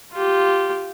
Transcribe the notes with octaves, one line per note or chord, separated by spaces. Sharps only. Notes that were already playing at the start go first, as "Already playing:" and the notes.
F4 G4